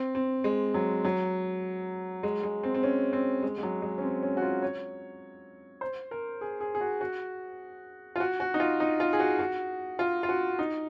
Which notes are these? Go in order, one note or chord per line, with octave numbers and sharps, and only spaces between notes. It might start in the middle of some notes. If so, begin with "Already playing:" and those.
Already playing: C4
C4
G#3
F#3
F#3
G#3
G#3
C4
C4
C#4
C4
G#3
G#3
F#3
G#3
C#4
C4
C#4
F#4
F4
C#5
C5
A#4
G#4
G#4
G#4
F#4
F#4
F4
F#4
F#4
D#4
F4
D#4
F4
G#4
F#4
F#4
F4
F4
F#4
D#4